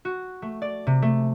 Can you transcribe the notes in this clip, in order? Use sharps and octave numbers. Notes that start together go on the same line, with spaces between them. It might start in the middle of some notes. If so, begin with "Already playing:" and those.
F#4
A3
D5
C3
A3